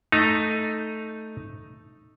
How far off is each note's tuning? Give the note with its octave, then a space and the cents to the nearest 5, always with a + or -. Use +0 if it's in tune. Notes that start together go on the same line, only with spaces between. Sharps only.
A3 +0 D#4 +0 A#5 +0